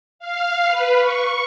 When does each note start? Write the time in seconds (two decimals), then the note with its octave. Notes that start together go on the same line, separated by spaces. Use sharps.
0.19 F5
0.67 B4
0.99 C#6